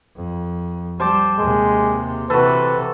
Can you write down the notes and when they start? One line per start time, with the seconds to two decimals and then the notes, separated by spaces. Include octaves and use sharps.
0.16 F2
1.00 G3 C5 A5 D6
1.39 D#2 C3 G#3
2.30 C3 E3 F#4 A4 B4